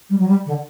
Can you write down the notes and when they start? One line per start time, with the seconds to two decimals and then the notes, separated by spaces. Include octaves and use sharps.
0.10 G3
0.19 F#3
0.28 G3
0.46 D3